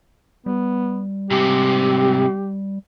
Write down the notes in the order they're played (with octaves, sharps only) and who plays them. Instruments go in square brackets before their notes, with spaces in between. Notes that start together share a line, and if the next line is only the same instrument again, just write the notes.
[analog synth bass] G3 [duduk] B3
[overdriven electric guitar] G#2 C3 [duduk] G4